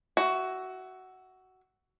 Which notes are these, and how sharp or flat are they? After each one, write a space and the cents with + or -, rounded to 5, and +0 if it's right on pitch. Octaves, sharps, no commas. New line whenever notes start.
F#4 +15 E5 +0